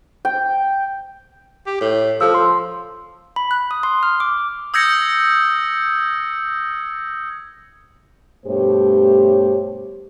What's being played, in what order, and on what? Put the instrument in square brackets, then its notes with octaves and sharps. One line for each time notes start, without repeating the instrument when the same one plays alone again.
[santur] G5
[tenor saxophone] G4
A2
[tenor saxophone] F3 [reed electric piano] A4 E6
[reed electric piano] C6
[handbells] B5
F#6
D#6
C6
F6
D6
[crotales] D#6 E6 G6 G#6 A#6 C#7
[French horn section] G2 B2 A3 G4 C5 C#5